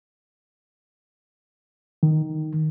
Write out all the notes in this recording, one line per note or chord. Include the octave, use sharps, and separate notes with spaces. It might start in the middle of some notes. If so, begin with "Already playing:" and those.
D#3